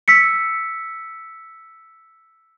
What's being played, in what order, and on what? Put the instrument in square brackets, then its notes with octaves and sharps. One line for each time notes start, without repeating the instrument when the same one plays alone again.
[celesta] E6 B6 C#7